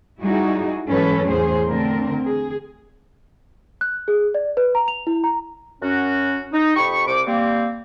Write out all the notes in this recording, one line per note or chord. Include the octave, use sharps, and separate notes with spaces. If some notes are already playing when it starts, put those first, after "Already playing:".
G3 D#4 E4 F#4 G#4
G#2 E3 F#3 C#4 A4 B4
E2 A2 C#4 G#4 C5
D3 A3 C4 A#4
G#4
F#6
G#4
D5
B4
A#5
F7
E4
A#5
F#2 C#4 F#4
D#4
F2 G4 B5 C#6
C2 C3 C5 D6
G3 A#3 C4